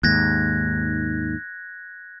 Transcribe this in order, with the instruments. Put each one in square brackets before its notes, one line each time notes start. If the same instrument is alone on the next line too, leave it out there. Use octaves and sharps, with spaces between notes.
[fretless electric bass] D#2 G#2 [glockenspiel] F#6 G#6 A#6